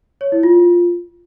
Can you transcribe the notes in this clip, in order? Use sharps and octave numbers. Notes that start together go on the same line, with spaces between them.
C#5
E4
F4